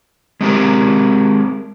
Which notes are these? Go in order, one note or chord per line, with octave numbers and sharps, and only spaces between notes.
G#3 C4 G4 A#4